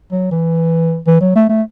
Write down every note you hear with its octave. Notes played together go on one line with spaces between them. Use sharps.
F#3
E3
E3
F#3
A3
A3